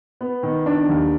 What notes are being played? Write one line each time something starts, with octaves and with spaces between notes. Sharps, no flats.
B3
D#3
D4
D#2